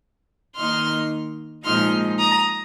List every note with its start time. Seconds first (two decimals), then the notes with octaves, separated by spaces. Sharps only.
0.56 D#3 A#3 D#4 C6 F6
1.65 A#2 F3 G#3 D#4 C6 F6
2.19 A#5 D#6